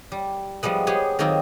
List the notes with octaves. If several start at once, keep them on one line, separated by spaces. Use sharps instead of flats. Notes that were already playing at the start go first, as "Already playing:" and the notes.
G3
F3 G3 G#3 B3
B3 G4 G#4 C#5
D#3 F#3 A#3 C4 D#4 F4